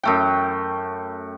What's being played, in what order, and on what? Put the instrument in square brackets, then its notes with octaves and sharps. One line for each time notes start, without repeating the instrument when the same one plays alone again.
[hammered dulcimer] F#2 A3 G5